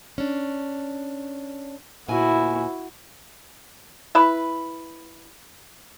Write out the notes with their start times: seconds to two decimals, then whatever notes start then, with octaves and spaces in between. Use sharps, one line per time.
0.18 C#4 D4
2.08 D2 A#2 E4 F#4 G#5
4.15 E4 B4